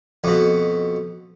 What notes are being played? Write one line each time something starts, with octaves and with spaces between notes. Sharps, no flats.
F2 B2